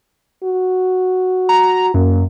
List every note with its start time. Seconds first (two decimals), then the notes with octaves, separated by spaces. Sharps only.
0.43 F#4
1.49 A#5
1.94 F#2 A#3